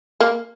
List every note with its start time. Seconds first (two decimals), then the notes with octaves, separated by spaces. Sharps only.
0.20 A#3